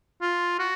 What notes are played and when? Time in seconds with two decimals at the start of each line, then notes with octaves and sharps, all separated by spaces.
0.21 F4
0.59 F#4